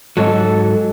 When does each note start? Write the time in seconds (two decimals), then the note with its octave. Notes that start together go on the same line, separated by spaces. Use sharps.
0.17 G#2 F#3 A4